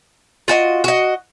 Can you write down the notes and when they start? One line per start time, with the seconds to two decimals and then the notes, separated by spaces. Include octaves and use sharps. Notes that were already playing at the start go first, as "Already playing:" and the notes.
0.48 F4 F#4 D#5
0.84 F#4 D#5